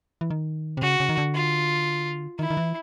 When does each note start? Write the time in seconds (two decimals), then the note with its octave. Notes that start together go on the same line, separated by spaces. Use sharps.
0.21 E3
0.31 D#3
0.77 C3
0.82 C#3 F#4
1.00 C#3
1.09 D#3
1.18 D3
1.34 F4
2.39 D#3 E4
2.50 D#3
2.57 E3